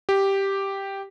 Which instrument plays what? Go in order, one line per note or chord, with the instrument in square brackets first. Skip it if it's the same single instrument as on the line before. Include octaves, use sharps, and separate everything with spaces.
[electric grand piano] G4